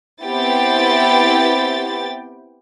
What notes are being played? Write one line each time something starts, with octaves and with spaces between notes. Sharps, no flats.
B3 C4 E4 G4 G5 A6